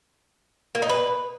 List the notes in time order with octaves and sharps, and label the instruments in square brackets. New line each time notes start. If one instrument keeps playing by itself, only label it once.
[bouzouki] A#3
D#4
B4